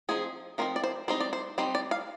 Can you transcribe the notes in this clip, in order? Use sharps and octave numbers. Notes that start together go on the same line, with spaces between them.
F3 C4 D#4 G#4
F3 C4 D#4 A#4
D5
C5
G3 C4 D#4 C5
D5
C5
G3 C4 D#4 C5
D5
F5